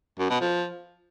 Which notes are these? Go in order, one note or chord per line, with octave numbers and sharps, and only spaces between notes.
F#2
B2
F3